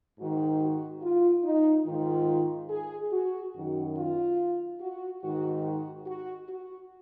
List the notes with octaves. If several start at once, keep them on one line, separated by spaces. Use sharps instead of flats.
G#2 D#3 F#4
F#4
F4
D#4
G#2 D#3 F4
G#4
F#4
F#2 D#3 F#4
F4
F#4
G#2 D#3 F#4
F#4
F#4
F#4